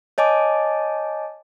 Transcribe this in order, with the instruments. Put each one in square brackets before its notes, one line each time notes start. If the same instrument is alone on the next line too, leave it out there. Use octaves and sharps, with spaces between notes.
[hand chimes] C#5 D#5 G#5 A5 D6